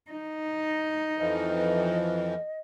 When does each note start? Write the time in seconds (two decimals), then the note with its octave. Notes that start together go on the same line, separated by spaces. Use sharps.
0.11 D#4
1.18 F2 E3 F3 D#5